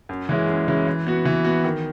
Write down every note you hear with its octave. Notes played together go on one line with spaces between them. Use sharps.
F#2
E3 G#3 C#4 E4
F#2
E3 G#3 C#4 E4
E3
B3 F#4
E3
B3 F#4
D#3